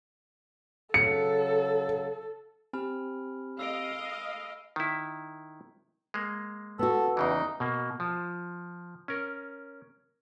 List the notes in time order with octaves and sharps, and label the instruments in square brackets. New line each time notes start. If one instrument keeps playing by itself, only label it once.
[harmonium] C#3 F#3 [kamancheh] A4 [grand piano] C#7
[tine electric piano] C4 G4 [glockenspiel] G#5 B5 F6
[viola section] D#5 F5 [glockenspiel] E6 C7 D7
[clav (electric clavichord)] D#3 E4
G#3 A#3
[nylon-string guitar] B3 F#4 [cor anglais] A4
[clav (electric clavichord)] E2 C#3 E3 [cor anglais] D#4
[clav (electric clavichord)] B2 A#3
F3
C#4 A#4